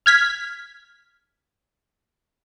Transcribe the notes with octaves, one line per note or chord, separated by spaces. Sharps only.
F6 G#6 B6